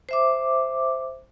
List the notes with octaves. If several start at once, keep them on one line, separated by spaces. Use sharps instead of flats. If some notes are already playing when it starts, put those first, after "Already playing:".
C5 E5 D6